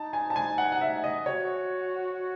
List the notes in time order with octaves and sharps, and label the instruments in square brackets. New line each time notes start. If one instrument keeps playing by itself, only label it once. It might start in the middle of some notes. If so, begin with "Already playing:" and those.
Already playing: [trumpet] D#4 [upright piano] A5
[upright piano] G#5
A5
G#5
F#5
F#5
E5
D#5
[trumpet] F#4 [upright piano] C#5